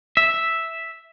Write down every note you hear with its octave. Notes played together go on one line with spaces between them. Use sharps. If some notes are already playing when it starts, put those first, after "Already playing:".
E5